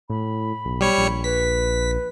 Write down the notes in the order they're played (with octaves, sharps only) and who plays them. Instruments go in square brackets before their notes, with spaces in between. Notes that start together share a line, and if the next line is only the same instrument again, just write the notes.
[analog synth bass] A2 [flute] B5
[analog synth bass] B1
[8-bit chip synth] G3 C#5 C#7
[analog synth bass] A#1
[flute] B4 [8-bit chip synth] B6